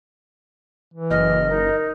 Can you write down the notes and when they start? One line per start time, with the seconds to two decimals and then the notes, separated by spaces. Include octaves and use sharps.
0.94 E3
1.10 F#1 D#5 F6
1.50 D#4 A#4